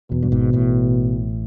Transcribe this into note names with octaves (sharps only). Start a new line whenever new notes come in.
E2 B2
G2
G#1 G#2
A1 A2